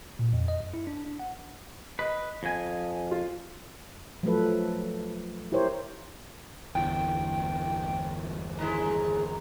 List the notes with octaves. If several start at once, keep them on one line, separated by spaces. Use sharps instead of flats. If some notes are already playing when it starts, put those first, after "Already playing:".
A#2
F2
D#5
F#2
E4
D4
D4
F#5
B4 D#5
F2 G#5
F4
F3 F#3 A3 A4 B4
E4 G4 A#4 C5 C#5
G1 E2 G5
D#2 G#3 E4 A#5